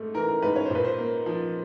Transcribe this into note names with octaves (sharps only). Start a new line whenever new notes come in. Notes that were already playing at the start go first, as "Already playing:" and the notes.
Already playing: G#2 A3
E3 A#4
A#4
G#2 B4
C#5
C5
A#2
B4
C5
A#3
F3